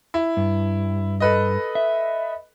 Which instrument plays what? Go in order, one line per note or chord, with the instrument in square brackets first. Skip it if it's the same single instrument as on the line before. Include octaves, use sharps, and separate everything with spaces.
[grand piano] E4
[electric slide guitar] G2
[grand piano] A4 B4 D#5
[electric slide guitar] E5